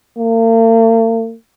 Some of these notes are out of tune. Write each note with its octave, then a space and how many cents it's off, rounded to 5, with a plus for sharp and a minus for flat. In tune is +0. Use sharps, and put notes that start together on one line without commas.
A#3 -45